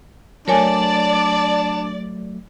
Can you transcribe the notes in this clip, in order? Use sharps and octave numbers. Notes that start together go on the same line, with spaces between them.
F#3 A3 D4 A#4 C#5 D5 G#5